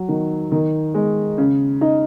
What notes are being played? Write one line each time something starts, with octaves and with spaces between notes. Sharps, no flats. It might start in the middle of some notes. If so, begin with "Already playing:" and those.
Already playing: F#3
D#3
D#3
G#3
C#3
D#4